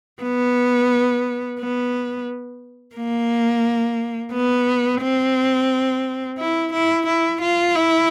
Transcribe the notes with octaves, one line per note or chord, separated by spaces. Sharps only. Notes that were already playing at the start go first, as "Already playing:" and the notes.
B3
B3
A#3
B3
C4
E4
E4
E4
F4
E4